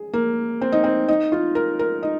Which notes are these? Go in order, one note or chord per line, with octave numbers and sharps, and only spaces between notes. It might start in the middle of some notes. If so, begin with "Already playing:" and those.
Already playing: G#4
A#3
C4
D#4
C4
D#4
F4
A#4
A#4
D#4